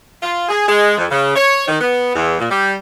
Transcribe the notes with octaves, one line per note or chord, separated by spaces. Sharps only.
F4
G#4
G#3
F2
C#3
C#5
D#3
B3
E2
A#2
G3